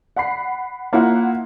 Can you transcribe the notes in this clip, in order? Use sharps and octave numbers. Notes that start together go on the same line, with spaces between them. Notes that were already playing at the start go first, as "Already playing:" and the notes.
F#5 B5 C7
A#3 E4 F4 F#5